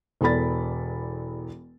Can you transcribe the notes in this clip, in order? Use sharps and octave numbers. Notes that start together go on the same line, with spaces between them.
E1 E2 A4 D5 B5 A6